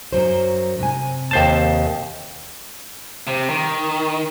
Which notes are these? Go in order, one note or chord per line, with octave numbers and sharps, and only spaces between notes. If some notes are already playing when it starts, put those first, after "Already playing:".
F#2 F#3 C5
C3 G#5
D#2 C5 A5
C3
D#3